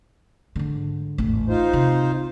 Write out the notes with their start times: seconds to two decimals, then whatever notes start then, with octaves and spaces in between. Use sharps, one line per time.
0.56 G#2 D3
1.18 A1 E2
1.49 D#4 F4 C5
1.73 C3